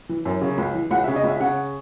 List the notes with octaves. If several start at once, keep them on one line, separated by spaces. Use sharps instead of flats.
E3
F#2
C#3
C#2
E3
C#2 F#5
E5
C#3
D#5
C#2 E5
C#3 F#5